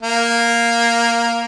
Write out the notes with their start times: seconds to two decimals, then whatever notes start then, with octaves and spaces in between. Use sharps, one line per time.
0.02 A#3